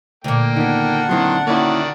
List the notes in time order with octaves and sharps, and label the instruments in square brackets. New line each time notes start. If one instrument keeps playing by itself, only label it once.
[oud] D2 A#2 [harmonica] A#3 G5
[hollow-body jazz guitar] D#3 B3 [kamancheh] D4 F#5
[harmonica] D#3 C6 [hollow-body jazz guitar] F#3 C4 E4
[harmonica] D#3 F#4 D5 [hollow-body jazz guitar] A#3 C#4 E4